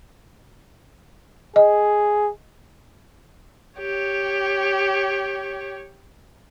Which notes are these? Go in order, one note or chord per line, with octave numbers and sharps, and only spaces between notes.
G#4 D#5
G4 C#5